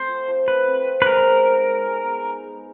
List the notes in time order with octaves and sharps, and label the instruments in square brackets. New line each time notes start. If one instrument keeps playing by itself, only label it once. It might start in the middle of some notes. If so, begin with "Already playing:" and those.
Already playing: [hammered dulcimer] A3 C4 [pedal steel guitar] C5
[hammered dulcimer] F3
F3
[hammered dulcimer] A3 [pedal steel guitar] B4
[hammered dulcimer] C4
F3
[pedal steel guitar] B4
[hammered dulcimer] G#3 [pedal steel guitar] A#4
[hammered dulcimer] B3
D#4
G#3
G#3
B3
D#4
G#3